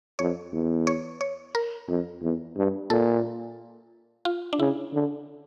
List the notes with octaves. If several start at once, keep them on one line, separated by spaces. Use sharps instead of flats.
F2 C#5
E2
C#5
C#5
A#4
F2
E2
G2
A#2 A4
F4
D4
C#3 E4
D3